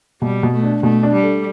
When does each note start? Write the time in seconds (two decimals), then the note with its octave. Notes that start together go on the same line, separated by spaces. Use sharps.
0.22 B2 G3
0.43 B2
0.53 A3
0.63 D4
0.83 B2 A3
1.03 D4
1.13 G3
1.24 A3